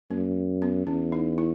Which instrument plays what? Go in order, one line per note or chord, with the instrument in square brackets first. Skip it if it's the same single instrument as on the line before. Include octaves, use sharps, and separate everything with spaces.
[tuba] F#2 [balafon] A#3
[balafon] B3
[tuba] E2 [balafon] C#4
[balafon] D#4
E4